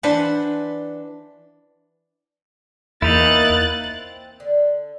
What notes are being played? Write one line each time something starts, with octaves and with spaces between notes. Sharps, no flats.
E3 D4 B4 C5 F#5
E2 A#3 D#4 E4 F#6 A6
C4
D3